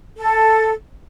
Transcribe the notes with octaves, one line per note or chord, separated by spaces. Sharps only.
A4